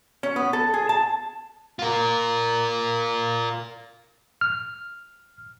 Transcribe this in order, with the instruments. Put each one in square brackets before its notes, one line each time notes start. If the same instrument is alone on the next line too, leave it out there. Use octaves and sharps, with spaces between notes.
[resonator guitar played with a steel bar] C#4
B3
A4
G#4
A5
[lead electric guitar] F4 A#4
[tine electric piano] F6